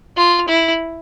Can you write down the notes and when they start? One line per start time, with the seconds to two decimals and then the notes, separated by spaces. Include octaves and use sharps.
0.17 F4
0.48 E4